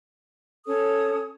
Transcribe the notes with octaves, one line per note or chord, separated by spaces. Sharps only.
C#4 A4 C#5 D#6